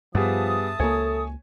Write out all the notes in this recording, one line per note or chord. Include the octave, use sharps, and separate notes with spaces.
G2 F3 G3 B3 G#4 E5 A5 D#6
C#2 A#3 A4 C#5 G#5